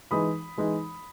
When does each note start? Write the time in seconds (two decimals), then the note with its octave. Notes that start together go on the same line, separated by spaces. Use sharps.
0.11 E3 G#3 D#4 B5 D#6
0.57 E3 G#3 D#4